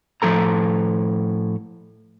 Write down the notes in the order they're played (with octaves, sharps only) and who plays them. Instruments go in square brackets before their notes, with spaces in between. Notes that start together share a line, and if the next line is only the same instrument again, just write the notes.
[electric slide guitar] A2 F3 C4 A4 A#5